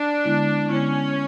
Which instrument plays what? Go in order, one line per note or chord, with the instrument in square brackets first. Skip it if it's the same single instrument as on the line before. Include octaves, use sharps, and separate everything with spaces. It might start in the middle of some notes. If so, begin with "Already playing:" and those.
Already playing: [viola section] D4
[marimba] D3 G#3 B3 E4
[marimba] D3 G#3 B3 E4 [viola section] C#4